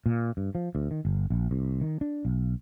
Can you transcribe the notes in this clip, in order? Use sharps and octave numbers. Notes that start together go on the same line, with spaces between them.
A#2
G2
F3
D2
D#3
G1
A#1
C2
D#3
D4
B1